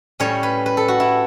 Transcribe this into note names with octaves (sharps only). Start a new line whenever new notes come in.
A2 G3 C#4 C#5
B4
B4
A4
F#4
E4